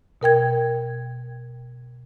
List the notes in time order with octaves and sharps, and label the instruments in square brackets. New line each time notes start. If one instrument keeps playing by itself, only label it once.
[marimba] B2 A#4 G5 G#6